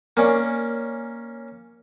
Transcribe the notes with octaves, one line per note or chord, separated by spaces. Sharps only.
A#3 C#4 D5